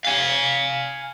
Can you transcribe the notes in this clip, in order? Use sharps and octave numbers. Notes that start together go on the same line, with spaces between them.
F5 G#5